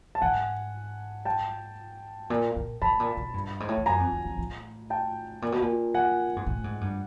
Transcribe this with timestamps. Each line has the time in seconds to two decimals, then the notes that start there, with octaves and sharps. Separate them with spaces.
0.15 A5
0.21 G#2 F#5 G#5
1.25 G5 A5
2.30 A#2
2.56 A#2
2.82 A2 A5 B5
3.00 A#2
3.17 B2
3.34 G2
3.60 G#2
3.68 A2
3.77 G#2
3.86 F#2 G#5 A#5
4.00 F2
4.12 E2
4.25 F2
4.38 A2
4.90 G5 A5
5.42 A#2
5.52 B2
5.62 A#2
5.94 F#5 G#5
6.36 G#2
6.46 A2
6.64 G#2
6.81 G2